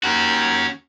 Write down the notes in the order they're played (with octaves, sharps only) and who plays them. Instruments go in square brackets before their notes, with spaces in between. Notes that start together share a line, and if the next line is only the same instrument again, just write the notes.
[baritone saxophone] D#2 [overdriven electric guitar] C#4 F#4